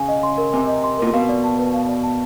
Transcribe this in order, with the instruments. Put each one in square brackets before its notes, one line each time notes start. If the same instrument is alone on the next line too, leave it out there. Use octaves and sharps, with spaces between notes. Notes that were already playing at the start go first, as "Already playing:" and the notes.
Already playing: [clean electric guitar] C#3 [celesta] G#5
[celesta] D#5
C6
A#4
[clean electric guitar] C3 [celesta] G#5
[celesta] D#5
C6
[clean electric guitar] A#2 [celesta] A#4
[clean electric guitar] B2 [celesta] F5
[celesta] D5
A5
B4
F5
D5
A5